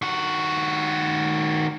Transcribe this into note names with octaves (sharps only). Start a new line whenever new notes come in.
D#3 F#4